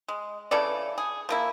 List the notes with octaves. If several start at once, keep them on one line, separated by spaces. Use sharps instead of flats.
G#3
C#3 E3 A4 D5
G#4
F3 A#3 E4